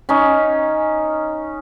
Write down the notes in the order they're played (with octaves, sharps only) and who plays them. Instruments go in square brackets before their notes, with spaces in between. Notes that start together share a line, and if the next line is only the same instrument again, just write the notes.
[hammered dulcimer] C#4 D#4